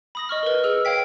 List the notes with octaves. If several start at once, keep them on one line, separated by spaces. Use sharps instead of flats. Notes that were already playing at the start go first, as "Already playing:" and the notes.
B5 D#6 A#6
D#5 C#6 F6
A#4 B4
G#4 E6 F6
C#5 F5 G5 B6